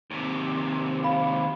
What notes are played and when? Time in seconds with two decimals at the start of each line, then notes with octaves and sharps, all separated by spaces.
0.11 D#2 C3
1.04 F5 B5